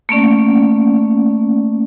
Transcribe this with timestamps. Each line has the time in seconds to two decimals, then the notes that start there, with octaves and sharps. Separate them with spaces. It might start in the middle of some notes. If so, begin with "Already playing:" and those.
0.09 A3 A#3 C#4 D5